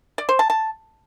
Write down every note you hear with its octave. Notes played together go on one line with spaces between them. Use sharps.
D5
C5
A5
A5